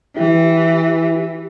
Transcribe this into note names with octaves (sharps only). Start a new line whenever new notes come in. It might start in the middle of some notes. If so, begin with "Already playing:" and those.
E3 E4 G4